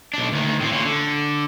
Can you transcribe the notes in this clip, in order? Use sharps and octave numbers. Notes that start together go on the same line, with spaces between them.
B1 D4
D2 D#3
A2 C4
A#2 C#4
D3